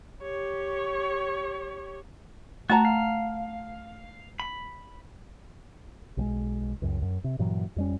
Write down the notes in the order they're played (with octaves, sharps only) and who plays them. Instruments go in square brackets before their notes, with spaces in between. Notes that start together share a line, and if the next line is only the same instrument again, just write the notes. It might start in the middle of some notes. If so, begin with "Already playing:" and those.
[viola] G4 C#5
[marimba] A3 [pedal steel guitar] F#4 [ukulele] F#5 A5 A#5
[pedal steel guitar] F5
B5
[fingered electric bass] B1 G3 G#3
C#2 F#2
F#2
C3
G2 A#2 E3 F#3
F2 G3 C#4